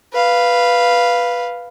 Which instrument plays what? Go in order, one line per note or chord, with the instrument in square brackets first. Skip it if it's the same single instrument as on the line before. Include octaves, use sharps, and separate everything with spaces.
[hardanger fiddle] B4 F5